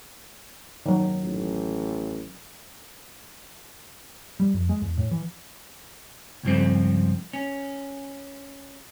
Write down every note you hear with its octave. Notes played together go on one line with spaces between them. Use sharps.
D#3 F#3
A1
G3
F2
G#3
E2
A2
E3
C#2 G2 F3 C4
C#4